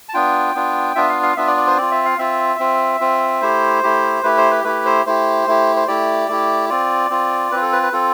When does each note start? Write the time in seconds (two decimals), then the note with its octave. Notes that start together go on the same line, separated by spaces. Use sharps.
0.09 A5
0.14 B3 D4 F4 G5
0.55 B3 D4 F4
0.95 B3 D4 F4 E5
1.09 F5
1.23 F5
1.37 B3 D4 F4 E5
1.47 D5
1.57 D5
1.67 C5
1.77 C4 F4 D5
1.91 E5
2.05 F5
2.19 C4 F4 E5
2.59 C4 F4
3.00 C4 F4
3.41 A3 E4 G4 C5
3.83 A3 E4 G4
4.23 A3 E4 G4 B4
4.37 C5
4.51 B4
4.64 A3 E4 G4 B4
4.86 C5
5.06 A3 E4 G4 C5
5.47 A3 E4 G4
5.76 C5
5.88 A3 E4 G4 D5
6.29 A3 E4 G4
6.69 C4 F4 D5
7.10 C4 F4
7.52 C4 F4 B4
7.62 A4
7.72 B4
7.83 B4
7.93 C4 F4 A4